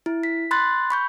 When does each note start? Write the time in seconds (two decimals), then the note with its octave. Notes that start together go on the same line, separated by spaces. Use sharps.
0.06 E4
0.23 B6
0.51 B5 C6 F#6 A6
0.90 B5 C#6 G6